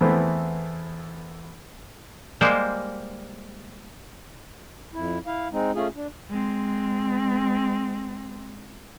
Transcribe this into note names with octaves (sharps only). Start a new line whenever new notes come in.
E2 E3 A3 B3 C4
G3 G#3 A#3 C5
F2 E4
E4 F5
G#3 C4 D#4
A3 C#4 F4 G#4
D4
G#3 C4